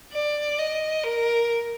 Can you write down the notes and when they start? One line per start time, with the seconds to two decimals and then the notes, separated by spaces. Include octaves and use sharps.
0.13 D5
0.58 D#5
1.04 A#4